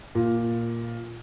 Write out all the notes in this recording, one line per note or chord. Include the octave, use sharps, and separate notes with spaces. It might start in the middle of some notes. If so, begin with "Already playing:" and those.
A#2